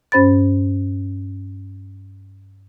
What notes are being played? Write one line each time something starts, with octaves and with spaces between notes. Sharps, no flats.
G2 C#4 C5 B5 A6